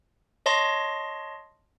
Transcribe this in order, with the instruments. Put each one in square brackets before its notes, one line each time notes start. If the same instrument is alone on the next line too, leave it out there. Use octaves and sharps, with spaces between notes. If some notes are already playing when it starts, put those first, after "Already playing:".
[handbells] C#5 D#5 A5 C6 A#6